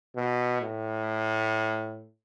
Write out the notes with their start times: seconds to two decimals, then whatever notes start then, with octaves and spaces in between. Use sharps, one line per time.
0.16 B2
0.62 A2